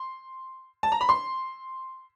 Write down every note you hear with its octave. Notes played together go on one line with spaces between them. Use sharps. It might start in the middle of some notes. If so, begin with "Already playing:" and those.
Already playing: C6
A5
A#5
B5
C6